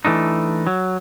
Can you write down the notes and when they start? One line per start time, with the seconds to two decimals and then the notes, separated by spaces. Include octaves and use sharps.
0.05 E3 A3 D4 D#4
0.67 F#3